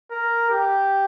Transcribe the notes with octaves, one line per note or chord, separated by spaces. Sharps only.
A#4
G4